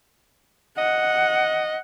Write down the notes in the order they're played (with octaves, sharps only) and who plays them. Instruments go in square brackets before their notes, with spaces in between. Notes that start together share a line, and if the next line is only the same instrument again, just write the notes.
[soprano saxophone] D#5 [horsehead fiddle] F#5